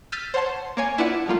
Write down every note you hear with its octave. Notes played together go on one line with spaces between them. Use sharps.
E6 F6 G6 A6 B6 D#7
C5 C#5 F#5 A5 C6
A#3 C#5 G#5
D4 E4 F4 B4 D5 F#5
F3 G3 A3 A#3 F4